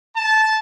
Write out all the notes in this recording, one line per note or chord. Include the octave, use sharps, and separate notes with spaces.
A5